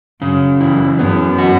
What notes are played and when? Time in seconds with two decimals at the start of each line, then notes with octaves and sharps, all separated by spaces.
0.22 F#2 C#3
0.60 E3
0.99 F#2 B3
1.38 F#4